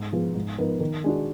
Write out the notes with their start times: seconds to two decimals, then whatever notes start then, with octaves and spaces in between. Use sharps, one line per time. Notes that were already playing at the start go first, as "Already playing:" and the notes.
Already playing: G#2
0.13 F3 B3 F4 G#4
0.35 G#2
0.58 F3 B3 D#4 A#4
0.80 D#3
1.04 G#3 D4 F#4